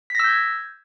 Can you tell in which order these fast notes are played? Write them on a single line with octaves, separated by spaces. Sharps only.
B6 A#6 E6 G6 G#6